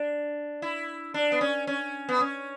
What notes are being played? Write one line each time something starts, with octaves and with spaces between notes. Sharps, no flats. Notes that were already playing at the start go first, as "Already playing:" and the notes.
Already playing: D4
E4
D4
B3
C#4
C#4
B3
C#4